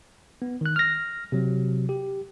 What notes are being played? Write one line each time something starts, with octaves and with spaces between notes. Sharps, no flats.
B3
D#3 F#6
F6 A#6
C3 F#3
G4